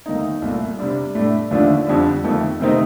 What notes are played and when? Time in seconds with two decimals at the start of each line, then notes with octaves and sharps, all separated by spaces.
0.06 D#2 D#3 A3 D#4
0.42 C2 A#2 A3
0.79 C3 G3 D4
1.15 A2 A3 D4
1.51 D#2 D3 F3 A3 D4
1.87 F2 D3 G3
2.24 F2 D#3 A3
2.60 C3 D#3 A3 C4 D#4